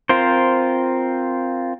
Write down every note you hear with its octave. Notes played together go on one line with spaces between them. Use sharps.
C4 F4 A#4 C5